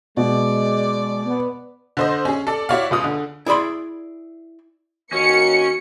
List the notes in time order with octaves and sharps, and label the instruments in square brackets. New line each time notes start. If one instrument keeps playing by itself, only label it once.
[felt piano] B2 [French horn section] G#3 [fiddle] D5
[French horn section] B3
[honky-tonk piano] D3 C5 D#5
C#4 G#4
A4 D5
E4 F#4 C#5 D5 F5
C#2 F4 D#6
D3
[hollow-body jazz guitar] E4 G#4 D5 B5 C6
[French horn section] D#3 A#3 F#4 [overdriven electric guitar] C#4 [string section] C#7